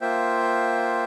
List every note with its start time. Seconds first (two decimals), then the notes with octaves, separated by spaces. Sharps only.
0.01 A#3 F4 C5 E5 G5